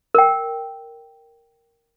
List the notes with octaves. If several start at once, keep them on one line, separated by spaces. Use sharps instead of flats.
A#4 G5